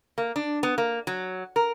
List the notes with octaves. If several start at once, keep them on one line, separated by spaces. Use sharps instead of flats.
A#3
D4
B3
A#3
F#3
A#4